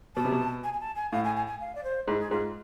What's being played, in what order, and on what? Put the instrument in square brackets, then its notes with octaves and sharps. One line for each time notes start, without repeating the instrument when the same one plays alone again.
[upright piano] B2 [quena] A5
[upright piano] C3
B2
[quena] G#5
G#5
A5
G#5
[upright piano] A2 [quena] F5
[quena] G#5
G#5
G#5
F5
D5
C5
[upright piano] G#2 [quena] E4
[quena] G#4
[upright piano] G#2 [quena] F4